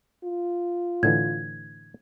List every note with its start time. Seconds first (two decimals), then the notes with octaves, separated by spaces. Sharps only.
0.24 F4
1.03 A2 D3 E3 G#6